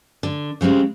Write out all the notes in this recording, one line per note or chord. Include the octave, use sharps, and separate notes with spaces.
D3
C#3 G3 G#3 C4